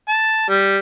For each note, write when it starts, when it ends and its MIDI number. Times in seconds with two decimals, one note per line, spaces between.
0.08 0.45 81
0.49 0.77 55